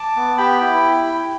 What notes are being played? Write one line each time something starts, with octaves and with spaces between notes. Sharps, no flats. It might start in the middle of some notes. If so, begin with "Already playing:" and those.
Already playing: A5 D6
B3
G4 G5 B5
E4